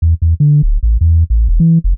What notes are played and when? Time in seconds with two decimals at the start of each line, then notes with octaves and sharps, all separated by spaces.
0.02 E2
0.22 E2
0.40 D3
0.63 D1
0.83 A1
1.01 E2
1.30 A1
1.49 E1
1.60 E3
1.84 F1